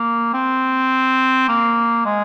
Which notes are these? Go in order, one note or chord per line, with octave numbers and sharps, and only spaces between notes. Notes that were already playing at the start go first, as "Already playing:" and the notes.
Already playing: A#3
C4
A#3
G#3